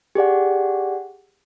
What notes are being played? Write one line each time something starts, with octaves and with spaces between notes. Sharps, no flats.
G4 G#4 D5 F#5